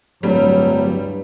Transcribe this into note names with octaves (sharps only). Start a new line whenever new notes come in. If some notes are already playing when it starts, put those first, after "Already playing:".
D1 G2 F#3 G3 A3